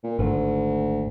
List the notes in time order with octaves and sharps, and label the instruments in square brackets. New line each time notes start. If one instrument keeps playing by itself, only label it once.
[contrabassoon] A#2
[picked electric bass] G#1 [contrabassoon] D2